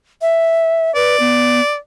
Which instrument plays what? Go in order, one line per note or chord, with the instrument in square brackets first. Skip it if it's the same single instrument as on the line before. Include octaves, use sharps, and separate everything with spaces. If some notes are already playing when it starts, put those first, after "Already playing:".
[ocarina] E5
[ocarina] B4 [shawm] D5
[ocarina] B3